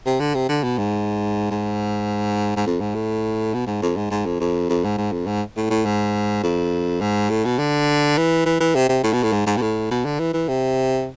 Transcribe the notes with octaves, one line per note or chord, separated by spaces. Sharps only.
C3
D3
C3
D3
B2
G#2
G#2
G#2
F2
G#2
A2
B2
G#2
F2
G#2
G#2
F2
F2
F2
G#2
G#2
F2
G#2
A2
A2
G#2
F2
G#2
A2
B2
D3
E3
E3
E3
C3
C3
A2
B2
A2
G#2
G#2
B2
A2
B2
D3
E3
E3
C3